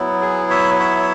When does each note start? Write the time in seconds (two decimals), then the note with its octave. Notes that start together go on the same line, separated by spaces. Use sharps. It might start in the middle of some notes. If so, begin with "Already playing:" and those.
Already playing: F#3 B3 E4
0.22 G#4
0.50 C#5 E5
0.79 C#5 E5